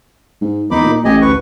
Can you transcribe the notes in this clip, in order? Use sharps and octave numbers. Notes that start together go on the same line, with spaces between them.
G#2
E2 D#4 B5 D6
A#2
A1 G4 D#5 G#5
D2 B4 C#6